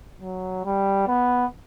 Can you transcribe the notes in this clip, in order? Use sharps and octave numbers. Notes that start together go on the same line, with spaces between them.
F#3
G3
B3